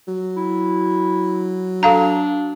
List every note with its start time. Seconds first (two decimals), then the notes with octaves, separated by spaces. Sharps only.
0.07 F#3
0.37 E4
1.83 D4 A4 F5 A#5